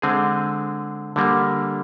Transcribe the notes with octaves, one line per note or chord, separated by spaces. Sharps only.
D3 G#3 C4 G#4
D3 G3 A#3